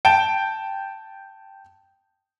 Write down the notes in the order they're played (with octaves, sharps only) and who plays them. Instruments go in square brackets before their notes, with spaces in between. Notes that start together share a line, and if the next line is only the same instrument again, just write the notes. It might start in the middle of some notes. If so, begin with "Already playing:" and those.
[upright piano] G5 A5 D7